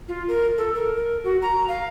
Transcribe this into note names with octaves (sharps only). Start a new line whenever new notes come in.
F4
A#4
A4
A#4
A#4
F#4
A#5
F5